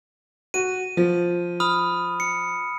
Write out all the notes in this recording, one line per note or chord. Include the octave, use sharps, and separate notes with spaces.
F#4 D#7
F3
B5 D#6 F6
C#7